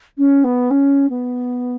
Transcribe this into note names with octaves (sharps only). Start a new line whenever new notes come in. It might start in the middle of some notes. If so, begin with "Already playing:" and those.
C#4
B3
C#4
B3